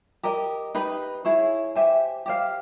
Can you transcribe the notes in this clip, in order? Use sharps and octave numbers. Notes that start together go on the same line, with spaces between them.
G4 A#4 D#5
D#4 G4 B4
E4 G#4 C#5
G4 C5 E5 G#5
G4 C5 F5